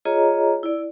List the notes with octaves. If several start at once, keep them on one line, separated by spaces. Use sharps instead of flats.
F4 G#4 C#5 D#5 A#5
E4 D5